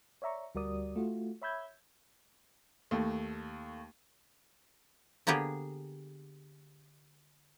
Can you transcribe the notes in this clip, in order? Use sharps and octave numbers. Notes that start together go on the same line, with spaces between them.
C#5 D5 E5 A#5 C#6
D2 G3 F#4 A#4 D5 D#6
A3 F4 F#4
C#5 E5 B5 E6 G6 G#6
D#2 A3
D3 A#3 B3 G4 G#4